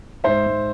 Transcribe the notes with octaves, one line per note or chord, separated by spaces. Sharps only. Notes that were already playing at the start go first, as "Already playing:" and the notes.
G#2 C5 E5
G#2